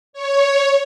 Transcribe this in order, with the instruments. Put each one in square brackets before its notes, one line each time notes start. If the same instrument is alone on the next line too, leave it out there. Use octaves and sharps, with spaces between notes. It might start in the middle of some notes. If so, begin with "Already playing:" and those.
[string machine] C#5